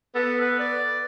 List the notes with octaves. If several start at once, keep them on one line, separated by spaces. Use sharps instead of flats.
B3 A4
B4
D5